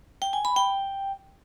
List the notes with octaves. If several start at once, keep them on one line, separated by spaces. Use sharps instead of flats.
G5
G#5
B5
G5